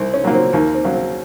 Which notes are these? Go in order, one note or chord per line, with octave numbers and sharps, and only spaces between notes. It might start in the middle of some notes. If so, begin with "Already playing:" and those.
Already playing: C2 C4
C#4
A#2 F#3 A#3
C4
D#2 A#3
C4
C#3 F#3
C4